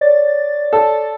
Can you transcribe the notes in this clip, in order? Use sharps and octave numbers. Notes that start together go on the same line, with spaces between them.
C#5 D5 A6
A4